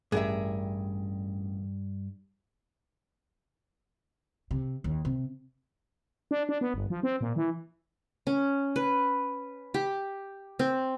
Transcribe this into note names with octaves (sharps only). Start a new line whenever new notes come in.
A1 G2 G#4 A#4 E5
C3
D#2
C3
D4
D4
B3
G1
F3
C4
A#2
E3
C#4
B4
G4
C4